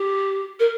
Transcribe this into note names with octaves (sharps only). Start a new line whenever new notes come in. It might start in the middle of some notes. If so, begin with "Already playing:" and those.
Already playing: G4
A#4